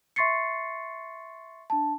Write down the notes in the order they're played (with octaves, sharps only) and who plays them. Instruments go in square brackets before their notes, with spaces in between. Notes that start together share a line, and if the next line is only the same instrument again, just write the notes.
[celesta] E5 C6 C#6 A6 C7 C#7
D4 A5